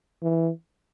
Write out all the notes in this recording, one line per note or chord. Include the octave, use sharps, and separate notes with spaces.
E3